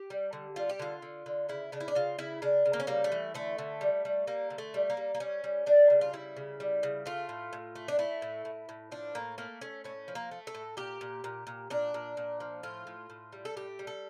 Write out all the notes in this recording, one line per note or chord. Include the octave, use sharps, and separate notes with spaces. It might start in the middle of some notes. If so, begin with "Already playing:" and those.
Already playing: G4
G3
D3
G3 F4
G4
D3 F4
D3
D3
C#3 E4
C#3 D4
E4
D4
C#3 F4
C#3 E4
C#3 D4
C#3
A#3
C#4
G3 A#3
A3
E3
D3 A3
D3
G3
G3
G3 A#3
D3
A3
G3
A#3
G3
A#3
G3 C#4
G3
G3 D4
C#3
F4
G3 E4
C#3
G3
C#3
A3 F4
A2
A2
A3
D4
A3 E4
A2
A2
A2
F3 D4
A2 A#3
A3 A#3
A3 C#4
A2 C#4
F3
A#3
A3
A4
A2
A#2 G4
A#2
A#2
A#2
A#2 D4
A#2
A#2
F3
A2 F4
A2
A2
G3
A4
A2 G4
G3
A4